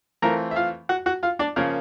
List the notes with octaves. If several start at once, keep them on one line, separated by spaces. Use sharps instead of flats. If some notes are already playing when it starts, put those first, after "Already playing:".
E3 A3 C4 F4 A#4 A#5
E5
F4 F5
F#4 F#5
F#4 F#5
F4 F5
D4 D5
C#3 F3 A#3 C#4 A#4